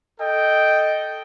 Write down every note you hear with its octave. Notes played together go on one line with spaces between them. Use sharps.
A4 D#5 G5